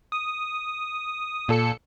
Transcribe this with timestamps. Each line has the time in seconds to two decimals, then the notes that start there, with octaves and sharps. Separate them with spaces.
0.12 D#6
1.49 A#2 A4 C#7